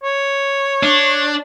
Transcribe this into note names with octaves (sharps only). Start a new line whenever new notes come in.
C#5
D4